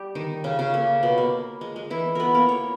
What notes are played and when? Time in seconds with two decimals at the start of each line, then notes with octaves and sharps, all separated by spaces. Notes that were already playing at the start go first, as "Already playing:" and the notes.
Already playing: G3 G4
0.15 D#3 D#4
0.44 C#3 C#4
0.59 C#3 C#4
0.74 A#3
1.03 B2 B3
1.18 A#3
1.61 G#3
1.76 G#3
1.90 E3 E4
2.15 B3 A#4 B4
2.34 A#3 A#4
2.49 C#5